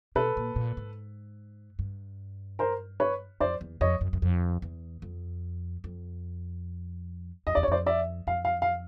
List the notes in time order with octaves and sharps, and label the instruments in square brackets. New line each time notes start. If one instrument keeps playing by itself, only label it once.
[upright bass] B2 [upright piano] A4 B4
[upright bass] A#2
A#2
G#2
G2
[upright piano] A#4 C5
B4 C#5
[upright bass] F2 [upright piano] C5 D5
[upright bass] E2
[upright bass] F2 [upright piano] C#5 D#5
[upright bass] F#2
F#2
F2
E2
F2
F2
[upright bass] F2 [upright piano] D#5
[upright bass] E2 [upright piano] D5
[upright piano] C#5
[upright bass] F2 [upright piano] C5 D5
[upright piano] D5 E5
[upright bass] F2 [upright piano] F5
[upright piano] F5
F5